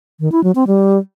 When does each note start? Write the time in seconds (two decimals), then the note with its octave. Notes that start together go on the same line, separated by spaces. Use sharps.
0.20 D#3
0.32 E4
0.44 F#3
0.55 C4
0.67 G3